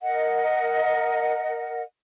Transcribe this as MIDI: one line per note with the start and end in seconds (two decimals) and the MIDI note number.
0.02 1.81 70
0.02 1.81 75
0.02 1.81 78